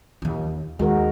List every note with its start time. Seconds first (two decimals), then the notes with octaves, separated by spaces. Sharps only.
0.22 D#2 F4
0.79 D#2 G#3 F#4 A#4